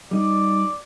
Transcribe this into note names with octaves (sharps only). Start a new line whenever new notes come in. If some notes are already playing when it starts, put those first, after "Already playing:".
G3 D#4 D5